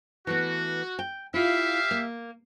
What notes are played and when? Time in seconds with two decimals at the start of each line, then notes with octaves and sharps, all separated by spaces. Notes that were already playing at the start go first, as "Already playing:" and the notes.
0.27 E3 A3 B3 F#4
0.99 G5
1.34 E4 F4 G4 E5 F5
1.91 A#3